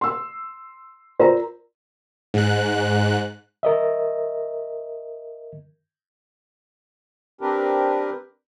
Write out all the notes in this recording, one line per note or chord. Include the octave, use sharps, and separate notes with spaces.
C6 E6
F4 A#4 C5 D5 A#5
G#2 F#6
A#4 D#5 E5
C4 D4 G4 A#4 B4